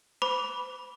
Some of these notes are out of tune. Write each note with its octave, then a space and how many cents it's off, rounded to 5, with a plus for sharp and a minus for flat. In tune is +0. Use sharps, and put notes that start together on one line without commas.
C5 -35 B5 -10 D6 -25